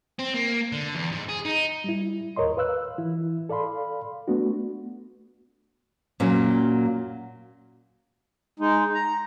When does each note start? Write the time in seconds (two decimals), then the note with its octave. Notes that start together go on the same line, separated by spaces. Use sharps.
0.19 C4
0.34 A#3
0.72 D3
0.95 E2
1.11 G#2
1.29 G#4
1.45 D#4
1.84 G3 E4
2.36 D#2 A#4 C#5 D#5 C6
2.57 B4 F5 E6 F#6
2.98 E3 E4
3.49 A4 D5 F5 B5 C6
4.28 A3 B3 D4 F#4
6.20 A#2 F#3 C#4
8.59 G#3 D#4
8.94 A#5